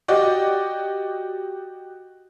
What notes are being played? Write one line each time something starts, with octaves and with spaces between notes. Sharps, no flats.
F#4 G4 D5 D#5